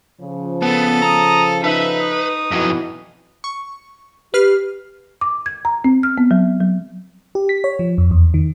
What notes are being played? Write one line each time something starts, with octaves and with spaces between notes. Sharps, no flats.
C#3 F3
B3 A4
A#5 D#6
D#4 B4 E5
D#6
F2 B2 E3 F#3
C#6
G4 B4 F6 C7
D6
G#6
A#5
C4
F6
B3
F#3
F#3
G4
B6
C#5
F3
F2
E2
D#3